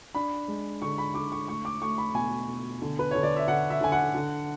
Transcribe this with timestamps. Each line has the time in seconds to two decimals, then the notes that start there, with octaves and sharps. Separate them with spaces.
0.15 D4 B5
0.48 G#3
0.82 D3 C#6
0.98 B5
1.14 D3 D6
1.32 C#6
1.48 A3 C#6
1.65 D6
1.82 A3 C#6
1.98 B5
2.15 B2 G#5
2.48 B2
2.82 D3
2.99 B4
3.11 D3 C#5
3.23 D5
3.36 E5
3.48 D3 F#5
3.70 E5
3.81 D3 G#5
3.92 F#5
4.15 D3